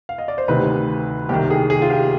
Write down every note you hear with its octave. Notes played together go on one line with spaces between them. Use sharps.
F5
D#5
D5
C5
D2 C3 D#3 B4
C2 C3 D#3 G4
G#4
G#4
F4
G4